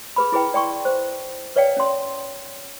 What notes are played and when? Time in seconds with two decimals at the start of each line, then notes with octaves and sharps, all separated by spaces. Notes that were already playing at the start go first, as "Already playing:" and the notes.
0.16 G#4 B4 B5
0.32 E4 G#4 B4 G5
0.54 D5 G5 C6 C#6
0.85 C5
1.56 B4 C#5 D5 F5 G5
1.77 C#4 C6